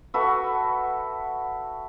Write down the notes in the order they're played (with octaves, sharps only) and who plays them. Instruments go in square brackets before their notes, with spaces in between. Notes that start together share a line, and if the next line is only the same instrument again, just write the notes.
[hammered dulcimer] F#4 A4 B4 E5